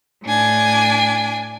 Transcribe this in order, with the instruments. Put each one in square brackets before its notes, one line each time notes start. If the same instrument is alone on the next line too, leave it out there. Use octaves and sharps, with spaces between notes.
[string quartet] A2 D4 G#5